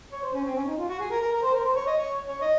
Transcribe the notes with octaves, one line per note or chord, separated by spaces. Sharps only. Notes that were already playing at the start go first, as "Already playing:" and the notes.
C#5
C5
C#4
C4
C#4
D#4
F4
F#4
G#4
A#4
A#4
A#4
C5
A#4
C5
C#5
D#5
C#5
C#5
D#5